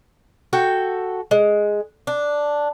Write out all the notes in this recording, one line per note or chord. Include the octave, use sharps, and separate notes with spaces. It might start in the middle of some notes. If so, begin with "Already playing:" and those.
F#4 A4 G5
G#3
D4